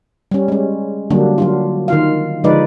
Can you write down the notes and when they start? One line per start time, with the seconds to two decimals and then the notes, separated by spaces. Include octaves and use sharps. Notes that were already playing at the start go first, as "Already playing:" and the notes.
0.31 G3 C#4
0.48 G#3 C#4
1.10 D3 F#3 G3 A#3 D4
1.38 F#3 D4 F4
1.88 D#3 F4 F5
2.44 D3 F3 G#3 D#4 B4 D5